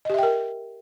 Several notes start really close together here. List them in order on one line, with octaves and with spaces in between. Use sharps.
D#5 G4 E5 G5 A#4